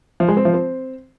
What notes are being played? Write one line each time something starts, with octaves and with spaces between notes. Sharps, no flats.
F3
G#3
C4
F3
C4